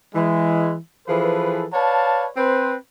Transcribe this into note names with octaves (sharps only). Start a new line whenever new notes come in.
E3 G#3
E3 F3 G#4 A4 B4
B4 C#5 D5 F5 A5
C4 B4 C5